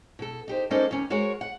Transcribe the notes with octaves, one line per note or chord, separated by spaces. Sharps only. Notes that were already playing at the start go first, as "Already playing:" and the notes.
B2 A4
D#4 G4 C5
G3 A#3 C#4 D#4 A4 C5
D#2 C#4
G#3 F#4 A#4 C5 C#5
F#5